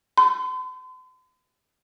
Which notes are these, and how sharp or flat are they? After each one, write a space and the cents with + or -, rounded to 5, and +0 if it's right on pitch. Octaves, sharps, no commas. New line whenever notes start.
C6 -45